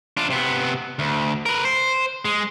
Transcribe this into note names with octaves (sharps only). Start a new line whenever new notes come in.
D4 F4
C3 B3
D2
A#4 B4
C5
G#3